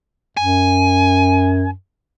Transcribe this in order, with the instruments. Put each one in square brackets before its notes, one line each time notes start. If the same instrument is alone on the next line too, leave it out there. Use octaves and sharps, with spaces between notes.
[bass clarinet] F#2 [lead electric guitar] G#5